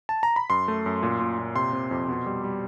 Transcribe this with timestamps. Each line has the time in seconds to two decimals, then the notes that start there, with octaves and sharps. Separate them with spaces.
0.09 A5
0.23 A#5
0.36 B5
0.50 F#2 C6
0.68 A3
0.86 F#2
1.03 A#2
1.20 A#2
1.39 A#2
1.55 C3 C6
1.73 C3
1.91 F2
2.09 B2
2.26 G3
2.44 G3